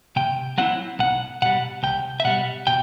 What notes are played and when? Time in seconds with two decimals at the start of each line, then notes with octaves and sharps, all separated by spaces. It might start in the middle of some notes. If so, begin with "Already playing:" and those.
0.16 C3 G5
0.58 F#3 C4 E4 F#5
0.99 B1 F#5
1.42 B2 G3 F#5
1.83 C2 G5
2.20 E5
2.25 B2 G3 F#5
2.67 B2 G5